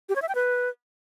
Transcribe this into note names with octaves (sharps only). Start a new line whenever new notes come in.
G4
C#5
E5
G5
B4